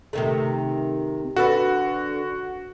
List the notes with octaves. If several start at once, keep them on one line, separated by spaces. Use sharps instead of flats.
C3 D#3 A3
D3 F#4 A4 B4